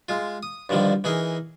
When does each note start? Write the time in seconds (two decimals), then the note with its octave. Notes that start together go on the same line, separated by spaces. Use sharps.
0.09 G#3 F4
0.43 D#6
0.69 G2 D3 D#3 F3 G3
1.04 E3 D#4 G#4 A#4